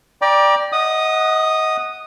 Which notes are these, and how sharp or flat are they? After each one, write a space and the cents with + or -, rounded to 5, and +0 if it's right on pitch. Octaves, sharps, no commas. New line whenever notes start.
D5 +5 G5 +15 A#5 +40
D#5 +25 F#5 +0 D#6 -10